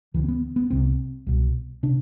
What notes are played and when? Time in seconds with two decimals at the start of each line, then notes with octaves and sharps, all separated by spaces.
0.14 D2 D3 E3
0.24 C4
0.28 B3
0.56 B3
0.70 C2 C3 C4
1.27 C2 B2
1.83 C3 D4